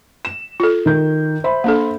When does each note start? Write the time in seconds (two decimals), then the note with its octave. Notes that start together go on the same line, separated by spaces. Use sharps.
0.25 E7
0.60 F4 A4
0.86 D#3 G6
1.44 C5 E5 B5
1.64 A#3 D4 A4